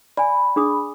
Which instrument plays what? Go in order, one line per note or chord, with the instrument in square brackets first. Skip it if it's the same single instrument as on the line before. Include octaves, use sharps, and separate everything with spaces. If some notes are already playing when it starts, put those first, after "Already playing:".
[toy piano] D5 G#5 [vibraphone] B5
[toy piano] D4 G#4 D#6